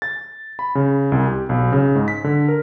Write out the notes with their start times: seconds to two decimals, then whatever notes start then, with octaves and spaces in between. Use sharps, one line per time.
0.02 A6
0.59 B5
0.75 C#3
1.12 C2
1.27 G4
1.49 B1
1.72 C#3
1.95 G#2
2.08 B6
2.24 D3
2.48 A#4